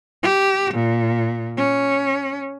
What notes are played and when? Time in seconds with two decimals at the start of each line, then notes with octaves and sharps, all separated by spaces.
0.23 G4
0.74 A#2
1.57 C#4